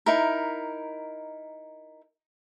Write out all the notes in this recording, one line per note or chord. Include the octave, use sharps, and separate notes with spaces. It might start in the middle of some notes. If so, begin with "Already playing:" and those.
D#4 E4 A#4